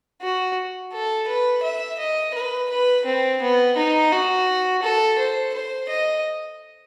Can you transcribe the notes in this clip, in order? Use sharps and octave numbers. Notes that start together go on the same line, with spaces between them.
F#4
A4
B4
E5
D#5
B4
B4
C4
B3
D#4
F#4
A4
C5
C5
D#5